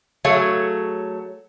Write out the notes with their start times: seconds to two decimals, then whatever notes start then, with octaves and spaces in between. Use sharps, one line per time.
0.25 F#3 A3 G#4 C#5 F5